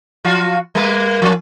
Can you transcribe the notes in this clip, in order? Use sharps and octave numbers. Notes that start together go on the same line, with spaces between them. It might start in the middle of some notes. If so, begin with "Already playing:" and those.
F3 F4 F#4
G3 A#3 B4
F3 C#4